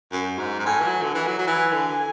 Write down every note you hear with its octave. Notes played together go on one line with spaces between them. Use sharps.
F#2
G#2
G#2
A2 G#5
E3
F#3
D3
E3
F#3
F#3
E3 G#5
D3